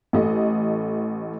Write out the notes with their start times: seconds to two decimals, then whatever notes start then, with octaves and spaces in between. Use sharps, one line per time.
0.13 A1 A3 D#5